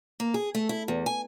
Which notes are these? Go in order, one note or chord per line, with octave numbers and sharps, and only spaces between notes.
A#3
G#4
A3
E4
E2
G#5